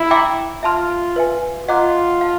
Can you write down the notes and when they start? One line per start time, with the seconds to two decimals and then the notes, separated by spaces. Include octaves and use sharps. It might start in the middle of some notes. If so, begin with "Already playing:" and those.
Already playing: E4
0.10 E5 G5 A#5 D6
0.63 F4 E5 A5 C6 F6
1.16 B4 E5 G#5
1.68 F4 D#5 F#5 A#5 D6 F#6
2.21 F5 A5